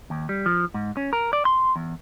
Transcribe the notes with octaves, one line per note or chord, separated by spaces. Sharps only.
D#2
G3
F3
G#2
C#4
A#4
D5
C6
E2